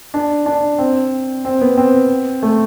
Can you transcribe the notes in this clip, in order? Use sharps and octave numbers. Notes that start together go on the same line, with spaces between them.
D4
D4
C4
C4
B3
C4
A3